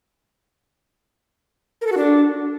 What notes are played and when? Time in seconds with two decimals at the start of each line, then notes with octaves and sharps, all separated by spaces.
1.81 A#4
1.87 A4
1.92 F#4
1.97 D4